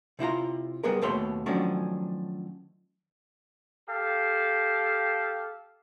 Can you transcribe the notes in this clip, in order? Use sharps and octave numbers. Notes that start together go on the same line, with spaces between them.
C3 E4 F4 A#5
G3 B3 G#4 A#4
D#2 B2 A3 C#5 B5 C6
D#3 F3 F#3 A3 C#4 D4
G4 A4 F5